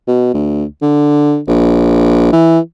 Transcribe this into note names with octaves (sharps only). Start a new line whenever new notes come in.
B2
D2
D3
A#1
E3